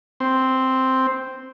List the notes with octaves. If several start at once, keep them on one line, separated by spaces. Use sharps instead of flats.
C4